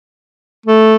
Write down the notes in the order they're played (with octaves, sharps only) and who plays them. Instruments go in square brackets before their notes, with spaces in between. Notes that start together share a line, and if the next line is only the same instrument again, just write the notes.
[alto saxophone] A3